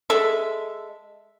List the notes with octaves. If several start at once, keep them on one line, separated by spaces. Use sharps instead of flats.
G#3 A4 E5